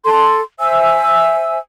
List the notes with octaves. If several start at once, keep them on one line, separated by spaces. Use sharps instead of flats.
A4 C6
C5 E5 G#5 E6